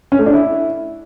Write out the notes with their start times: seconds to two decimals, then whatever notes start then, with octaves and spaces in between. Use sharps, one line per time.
0.12 C#4
0.19 A3
0.26 D4
0.33 E4